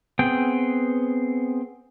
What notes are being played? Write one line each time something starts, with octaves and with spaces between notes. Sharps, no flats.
B3 C4 G#4 G5